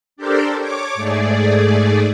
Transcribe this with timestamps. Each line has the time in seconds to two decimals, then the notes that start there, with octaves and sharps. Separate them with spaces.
0.16 D4 G4 A4 A#4 C5 D5
0.58 C#5 D6
0.95 G#2 A3 G#4 D5